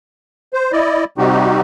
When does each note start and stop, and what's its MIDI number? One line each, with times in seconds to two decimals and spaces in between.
0.53 0.72 72
0.72 1.04 64
0.72 1.04 74
0.72 1.04 75
1.18 1.61 48
1.18 1.61 55
1.18 1.61 60
1.18 1.61 63
1.18 1.61 66
1.18 1.61 67